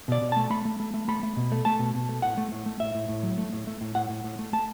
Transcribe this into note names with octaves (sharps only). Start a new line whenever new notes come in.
B2 D5
B2
A3 A5
A3 B5
A3
A3
A3
A3 B5
A3
B2
A3
A3 A5
B2
B2
A3
A2 F#5
A3
A2
A3
A2 E5
A2
A2
F#3
A3
A2
A3
A2
A2 F#5
A2
A2
A3
A3 A5